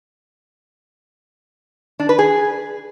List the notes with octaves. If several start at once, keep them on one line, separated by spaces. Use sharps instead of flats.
D4
B4
G#4